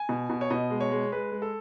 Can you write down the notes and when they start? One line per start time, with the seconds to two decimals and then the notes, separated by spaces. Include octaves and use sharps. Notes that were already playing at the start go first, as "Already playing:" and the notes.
Already playing: G#5
0.09 B2
0.30 B2
0.41 C#5
0.50 B2 D#5
0.70 G#3
0.80 C#5
0.91 G#3
1.12 G#3 B4
1.32 G#3
1.42 A4